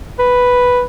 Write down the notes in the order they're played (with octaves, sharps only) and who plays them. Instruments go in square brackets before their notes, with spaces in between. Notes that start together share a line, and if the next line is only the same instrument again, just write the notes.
[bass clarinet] B4